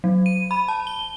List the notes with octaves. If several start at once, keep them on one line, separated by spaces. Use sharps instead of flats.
F#3
D#7
B5
A5
G7